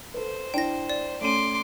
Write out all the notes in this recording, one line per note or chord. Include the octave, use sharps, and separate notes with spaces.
A4 B4 C5
D4 E4 G5 A#6
D5
A3 C#4 C6 D6 D#7